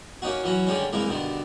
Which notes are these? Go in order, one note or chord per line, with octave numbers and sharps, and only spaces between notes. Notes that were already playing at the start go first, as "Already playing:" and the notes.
A#3 C#4 D#4 F#4
E3 F#3 C#4 F#4
D3 D#3 G3 G#3 C#4
C2 E3 G#3 A#3 A#5
G2 B2 D3 D#3